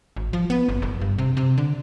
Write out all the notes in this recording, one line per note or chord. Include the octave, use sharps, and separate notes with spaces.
G#1
F3
B3
G1
F#1
G2
C3
C3
D3